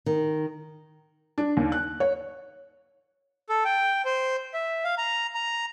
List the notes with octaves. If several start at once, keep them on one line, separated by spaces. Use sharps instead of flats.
D#3
D4
D#2
F#6
C#5
A4
G5
C5
E5
F5
A#5
A#5